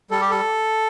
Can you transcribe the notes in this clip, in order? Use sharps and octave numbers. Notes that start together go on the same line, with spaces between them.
G3 A4
G4
A4